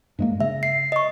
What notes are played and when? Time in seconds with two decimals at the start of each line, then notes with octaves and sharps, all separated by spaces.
0.19 G2 G#3 A#3
0.40 C#3 E5
0.63 C7
0.92 D#5 C#6